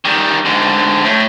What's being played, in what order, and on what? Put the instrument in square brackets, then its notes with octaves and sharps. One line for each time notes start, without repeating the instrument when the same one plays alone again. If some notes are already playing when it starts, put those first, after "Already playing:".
[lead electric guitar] D#3 G3
G#2 D3
A2